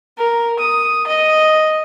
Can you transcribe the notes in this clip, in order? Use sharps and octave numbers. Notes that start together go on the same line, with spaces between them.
A#4
D#6
D#5